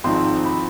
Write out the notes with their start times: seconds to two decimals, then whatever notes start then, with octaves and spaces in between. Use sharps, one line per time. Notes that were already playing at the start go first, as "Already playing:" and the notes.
0.04 G#1 G#2 F3 C4 D#4 C6
0.45 B5